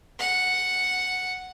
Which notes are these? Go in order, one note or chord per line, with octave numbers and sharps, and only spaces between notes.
F#5